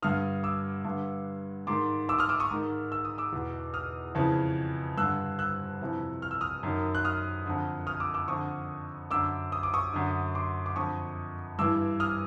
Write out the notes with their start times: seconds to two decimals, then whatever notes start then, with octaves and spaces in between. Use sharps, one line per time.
0.02 G2 D3 D#6 F6
0.43 D6 E6
0.85 G2 D3
1.67 G#2 D#3 C6 D6
2.09 D6 E6
2.19 D#6 F6
2.29 D6 E6
2.40 C#6 D#6
2.51 G#2 D#3
2.92 E6
3.05 D#6
3.18 D6 E6
3.32 E2 B2
3.74 D#6 F6
4.15 F2 C#3 E3
4.97 G2 D3 E6 F#6
5.39 E6 F#6
5.81 F2 C3 E3
6.22 F6
6.31 E6
6.41 D#6 F6
6.63 F#2 D#3
6.95 F#6
7.05 D#6 F6
7.46 F2 D3
7.87 D#6 F6
8.00 D6 E6
8.14 D6 E6
8.28 F2 D3 C#6 D#6
9.11 F#2 D3 D6 E6
9.52 D#6
9.63 D6
9.74 C#6 D#6
9.94 F#2 D3
10.34 C6 D6
10.66 D6
10.76 F2 D3 C#6 D#6
11.59 G2 E3 D6 E6
12.00 D#6 F6